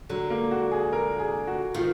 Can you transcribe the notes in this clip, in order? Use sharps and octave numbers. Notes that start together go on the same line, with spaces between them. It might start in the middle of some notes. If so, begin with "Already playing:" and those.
D3 F#3
A#3
F#4
G#4
A#4
G#4
F#4
D#3 F4